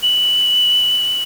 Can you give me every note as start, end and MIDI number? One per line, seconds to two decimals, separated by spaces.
0.02 1.23 102